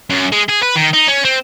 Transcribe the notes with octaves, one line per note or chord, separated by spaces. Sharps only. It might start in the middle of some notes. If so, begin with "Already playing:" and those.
F#2
G#3
G#4
B4
D#3
D#4
C#4
C4